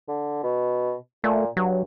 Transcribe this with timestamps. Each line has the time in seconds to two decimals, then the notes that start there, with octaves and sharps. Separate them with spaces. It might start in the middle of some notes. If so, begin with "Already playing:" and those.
0.08 D3
0.43 B2
1.24 A#2 A3
1.57 G2 F#3